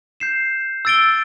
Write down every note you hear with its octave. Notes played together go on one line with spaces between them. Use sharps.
G6 C7 E7
E6 A6 D7 G7